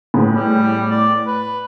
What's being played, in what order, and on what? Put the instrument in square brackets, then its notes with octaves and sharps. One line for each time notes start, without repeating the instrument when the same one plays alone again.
[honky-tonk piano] A2 B3 G#4
[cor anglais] G3
D5
B4